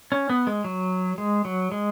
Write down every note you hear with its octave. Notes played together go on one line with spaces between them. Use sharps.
C#4
B3
G#3
F#3
G#3
F#3
G#3